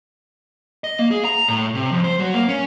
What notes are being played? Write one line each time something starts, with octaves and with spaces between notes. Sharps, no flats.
D#5
A#3
G#4
A#5
A2
C3
F2
C5
F#3
A#3
C#4